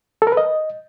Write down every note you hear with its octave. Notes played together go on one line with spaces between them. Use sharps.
A4
A#4
B4
D#5